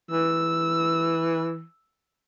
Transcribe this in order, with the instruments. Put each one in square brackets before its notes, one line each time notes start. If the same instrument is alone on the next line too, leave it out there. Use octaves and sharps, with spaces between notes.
[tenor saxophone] E3 [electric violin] E6